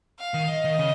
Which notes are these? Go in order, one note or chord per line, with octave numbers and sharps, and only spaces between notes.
F5
D#3
D#5
D#3
C#3